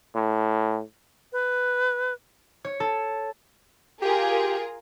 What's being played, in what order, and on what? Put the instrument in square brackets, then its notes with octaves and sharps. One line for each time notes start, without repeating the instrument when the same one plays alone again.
[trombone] A2
[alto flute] B4
[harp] C#5
A4
[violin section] F4 G#4 A#4 [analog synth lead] G4